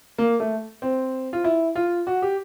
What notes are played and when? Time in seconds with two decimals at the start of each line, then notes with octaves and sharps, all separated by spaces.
0.18 A#3
0.40 A3
0.82 C4
1.33 F4
1.44 E4
1.75 F4
2.07 F#4
2.22 G4